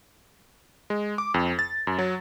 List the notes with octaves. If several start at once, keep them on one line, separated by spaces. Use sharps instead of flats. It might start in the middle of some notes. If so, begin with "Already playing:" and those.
G#3
D6
F2
A6
F#2
F#3